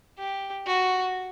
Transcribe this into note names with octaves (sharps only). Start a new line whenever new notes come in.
G4
F#4